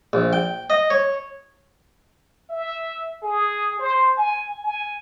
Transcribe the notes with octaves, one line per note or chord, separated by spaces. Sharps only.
A#1
G5
D#5
C#5
E5
G#4
C5
G#5
G#5